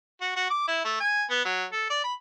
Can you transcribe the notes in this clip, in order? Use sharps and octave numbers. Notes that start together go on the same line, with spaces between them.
F#4
F#4
D6
E4
A3
G#5
B3
F#3
A4
D5
B5